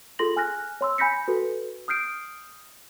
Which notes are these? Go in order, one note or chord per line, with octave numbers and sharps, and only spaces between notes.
F4 G#4 A4 C6 A#6 F#7
G#5 F6 F#6 A#6
C#5 C6 E6
G#5 B5 G6 A#6 B6 C#7
F#4 A4 B4
D#6 F6 G6 C7 D7